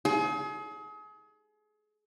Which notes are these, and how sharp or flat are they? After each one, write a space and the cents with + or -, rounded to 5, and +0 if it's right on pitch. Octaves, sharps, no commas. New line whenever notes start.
G#4 +35